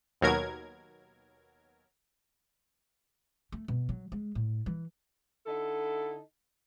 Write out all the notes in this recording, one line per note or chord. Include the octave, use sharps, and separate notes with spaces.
D#2 B2 F#3 A#4 G#6
A3
B2
F#3
G#3
A2
E3
D3 D#4 E4 A4